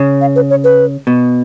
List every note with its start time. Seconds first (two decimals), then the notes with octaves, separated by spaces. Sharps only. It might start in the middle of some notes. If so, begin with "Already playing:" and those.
Already playing: C#3
0.21 F5
0.36 B4
0.50 C#5
0.64 B4
1.07 B2